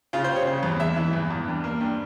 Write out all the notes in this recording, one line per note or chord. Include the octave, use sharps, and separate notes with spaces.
C#3 F4
C5
G3
C#5
C#3
E2
G#3 E5
E3
E2
E2
G2
A#3
G2